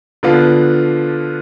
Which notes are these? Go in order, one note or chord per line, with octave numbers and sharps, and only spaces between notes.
D3 F3 B3 D4 F4